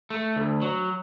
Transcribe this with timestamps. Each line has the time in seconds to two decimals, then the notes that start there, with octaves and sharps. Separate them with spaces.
0.10 A3
0.36 D2
0.62 F#3